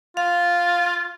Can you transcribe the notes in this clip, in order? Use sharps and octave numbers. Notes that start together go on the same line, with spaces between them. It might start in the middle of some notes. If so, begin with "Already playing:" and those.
F4 F5